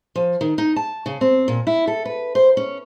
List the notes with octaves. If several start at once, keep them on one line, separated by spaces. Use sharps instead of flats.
F3
D#3
D#4
A5
C#3
C4
A#2
E4
A4
B4
C5
C#4